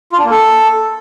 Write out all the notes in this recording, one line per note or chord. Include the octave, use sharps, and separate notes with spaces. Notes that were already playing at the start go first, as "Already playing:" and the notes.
F4
D4
A#3
A4